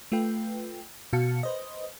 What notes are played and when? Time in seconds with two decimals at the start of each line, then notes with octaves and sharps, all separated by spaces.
0.12 A3 F4 B4 G5
1.13 B2 F#4 F5 A5 C#7
1.43 B4 C5 D#5